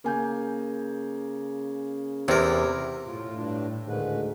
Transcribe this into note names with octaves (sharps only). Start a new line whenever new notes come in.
C#3 A#3 G#5 G6
E2 C3 A#4
A2 F4
G2 D4
D2 G#2 D#3 B4